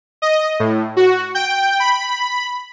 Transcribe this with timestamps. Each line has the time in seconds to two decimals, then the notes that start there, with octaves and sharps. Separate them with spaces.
0.22 D#5
0.60 A2
0.96 F#4
1.35 G5
1.80 B5